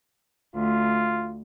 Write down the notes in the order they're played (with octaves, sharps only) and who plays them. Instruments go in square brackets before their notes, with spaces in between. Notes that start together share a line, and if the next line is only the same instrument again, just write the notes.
[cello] D2 [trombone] F4